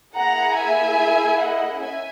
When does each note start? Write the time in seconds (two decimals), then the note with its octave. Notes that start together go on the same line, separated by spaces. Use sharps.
0.14 A#3 E4 G#4 F#5 A#5
0.56 E5 G#5
1.38 D#5 F#5
1.80 C#4 E5 G#5